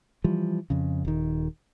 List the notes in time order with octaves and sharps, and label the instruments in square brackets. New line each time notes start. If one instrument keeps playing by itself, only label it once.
[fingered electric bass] E3 F3 G3
F2 C#3
D#1 D#3